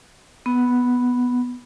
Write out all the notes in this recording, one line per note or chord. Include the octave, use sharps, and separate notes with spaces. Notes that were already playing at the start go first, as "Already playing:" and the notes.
B3